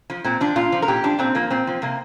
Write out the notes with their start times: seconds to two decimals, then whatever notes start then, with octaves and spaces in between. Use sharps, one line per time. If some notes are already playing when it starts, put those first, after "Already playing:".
0.10 F3
0.24 A#2 C4
0.41 F3 D4
0.56 A#2 F4
0.72 F3
0.82 A#4
0.88 A#2 G4
1.04 F3 D4
1.19 A#2 C4
1.35 F3 A#3
1.50 A#2 C4
1.67 F3
1.82 C3 A#3